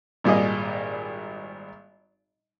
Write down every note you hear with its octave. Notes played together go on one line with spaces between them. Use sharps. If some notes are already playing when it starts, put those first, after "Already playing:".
G#1 A#2 G3 G#4 D#5